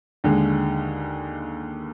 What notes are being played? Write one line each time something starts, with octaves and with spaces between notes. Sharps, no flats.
D#2 D3 G#3